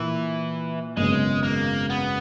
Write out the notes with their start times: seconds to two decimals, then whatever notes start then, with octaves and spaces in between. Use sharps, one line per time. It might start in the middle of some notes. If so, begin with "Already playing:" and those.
Already playing: A#2 E3 A#3 E4
0.97 G#1 F#2 C#3 F#3 G#3 B3
1.43 A#3
1.90 B3